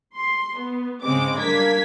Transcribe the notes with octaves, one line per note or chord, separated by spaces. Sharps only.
C6
B3
G#2 C#3 G#3 C4 D6
G3 A#3 D4 G#6 B6